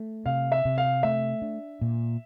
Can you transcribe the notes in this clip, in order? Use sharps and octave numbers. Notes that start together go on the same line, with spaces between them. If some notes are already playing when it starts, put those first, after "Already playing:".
Already playing: A3
C3 F5
E5
C3
F5
A3 E5
D4
A#2